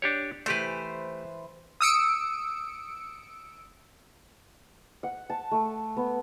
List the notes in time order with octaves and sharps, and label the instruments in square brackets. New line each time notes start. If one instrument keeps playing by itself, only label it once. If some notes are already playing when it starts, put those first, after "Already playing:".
[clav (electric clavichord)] D4 G4 C#5
[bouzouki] E3 C5 [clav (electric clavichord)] A3 G4 B4
[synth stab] D#6 E6 C#7 D7
[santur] F#5
A5
A3
B3